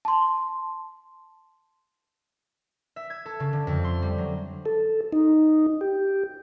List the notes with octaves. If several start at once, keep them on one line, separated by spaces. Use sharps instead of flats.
A5 C6
E5
G#6
A4
C#3
D3
F2
C6
G3
F#3
A4
D#4
G4